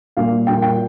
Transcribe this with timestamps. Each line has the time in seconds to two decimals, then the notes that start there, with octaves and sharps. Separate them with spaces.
0.17 A#2 G3 A#3 F5
0.47 A#2 G3 A#3 G5
0.62 G5